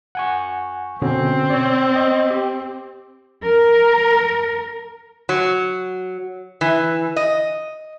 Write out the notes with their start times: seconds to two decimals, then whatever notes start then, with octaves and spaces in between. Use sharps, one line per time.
0.15 F#5 G#5 C#6
1.02 B2 D3 C4 C#4
1.50 C#5 D5
1.96 D#5
2.30 G4
3.43 A#4
5.29 F#3
6.61 E3
7.16 D#5